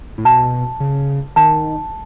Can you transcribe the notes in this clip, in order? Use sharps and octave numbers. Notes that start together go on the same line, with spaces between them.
A2
B2 A5
C#3
D#3 A5